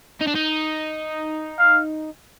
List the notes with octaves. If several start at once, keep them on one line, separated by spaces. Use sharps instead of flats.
D#4
D4
D#4
F5